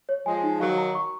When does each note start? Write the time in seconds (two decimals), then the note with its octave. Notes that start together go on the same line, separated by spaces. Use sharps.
0.09 C#5
0.26 F3 G#3 G#5
0.43 D#4
0.60 D#3 F#3 F5
0.78 A#5
0.95 C#6